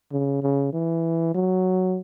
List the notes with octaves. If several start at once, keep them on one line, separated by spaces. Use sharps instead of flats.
C#3
C#3
E3
F#3